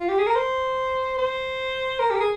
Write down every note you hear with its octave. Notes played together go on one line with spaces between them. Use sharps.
F4
G4
G#4
A#4
C5
C5
A#4
G4
A#4
G#4